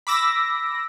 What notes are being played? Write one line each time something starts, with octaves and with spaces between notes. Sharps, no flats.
B5 D6 E6 A#6